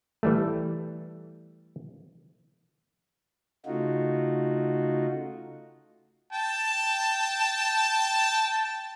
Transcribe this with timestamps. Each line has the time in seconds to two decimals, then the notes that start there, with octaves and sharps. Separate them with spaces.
0.23 E3 G3 A3
3.66 C#3 A3 D#4 F4 F#4
6.33 G5 A5